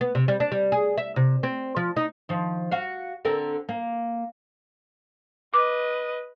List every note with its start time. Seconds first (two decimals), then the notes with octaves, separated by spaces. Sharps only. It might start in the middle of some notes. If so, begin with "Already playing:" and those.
0.01 B3
0.15 C3
0.28 G3
0.40 D4
0.52 G3
0.72 G#4
0.98 E5
1.16 C3
1.43 C4
1.76 F3
1.96 D#4
2.29 D#3 F3
2.71 F#4 F5
3.25 D3 C4 A#4
3.69 A#3
5.54 B4 D#5 D6